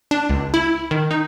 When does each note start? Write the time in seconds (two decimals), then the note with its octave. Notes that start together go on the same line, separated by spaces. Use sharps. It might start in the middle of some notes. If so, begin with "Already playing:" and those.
0.11 D4
0.30 C#2
0.54 E4
0.91 D#3
1.11 D#4